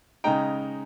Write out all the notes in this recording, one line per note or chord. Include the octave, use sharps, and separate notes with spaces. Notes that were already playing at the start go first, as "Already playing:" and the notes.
C#3 G#3 D#4 G5 A#5